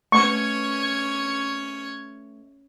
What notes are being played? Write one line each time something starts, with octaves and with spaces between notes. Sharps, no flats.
A3 C#4 B4 C#5 A5 C#6